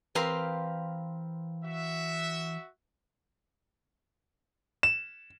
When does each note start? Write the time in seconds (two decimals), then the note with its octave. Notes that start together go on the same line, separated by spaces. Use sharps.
0.15 E3 C4 G4 A#4 B4 F5 C6
1.64 F#4 E5
4.83 E7